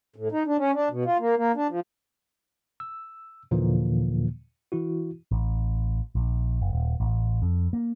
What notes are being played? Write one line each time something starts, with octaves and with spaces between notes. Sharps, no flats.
A2
D#4
D4
C#4
D4
B2
F4
A#3
A#3
D4
F3
E6
D#2 A#2 D3 E3 F3 A#3
E3 E4 F#4
A1
A#1
F#1
D#1
A1
F2
A#3